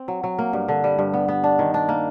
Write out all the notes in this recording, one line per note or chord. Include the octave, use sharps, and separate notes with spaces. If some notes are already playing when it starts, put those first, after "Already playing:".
Already playing: C4
F#3
F#3
A#3
G2
D3
G3
G2
B3
B3
D4
D#3
D4
A#3